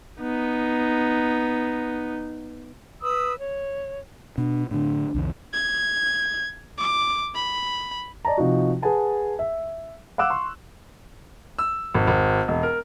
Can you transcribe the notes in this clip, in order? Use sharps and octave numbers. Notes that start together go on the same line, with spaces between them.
B3 D#4
B4 B5 D#6 E6
C#5
B2 D4
A2 D3 D4
C2 F2 D#3
G#6
D6
B5
D5 D#5 A5 A#5
C3 F3 D#4 F#4
G#4 B4 F#5 G#5 A5
E5
F5 F#5 D6 E6 F#6
C6 C#6
E6
G#1
G#1
E1
A#4